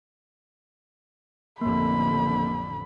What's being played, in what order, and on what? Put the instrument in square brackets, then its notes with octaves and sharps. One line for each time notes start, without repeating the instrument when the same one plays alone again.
[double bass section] A1 F2 D3 [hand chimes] A#3 [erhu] B5